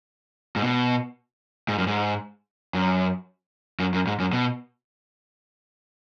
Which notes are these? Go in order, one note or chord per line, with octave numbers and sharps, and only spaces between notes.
G#2
B2
G#2
F#2
G#2
F#2
F#2
F#2
G#2
F#2
B2